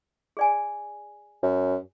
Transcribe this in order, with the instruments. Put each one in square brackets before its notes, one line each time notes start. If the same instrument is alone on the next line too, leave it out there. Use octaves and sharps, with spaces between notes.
[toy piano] G#4 D5 G#5
[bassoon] F#2